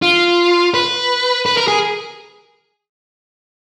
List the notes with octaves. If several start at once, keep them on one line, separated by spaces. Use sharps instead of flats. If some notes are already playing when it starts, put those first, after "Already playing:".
F4
B4
B4
A#4
G#4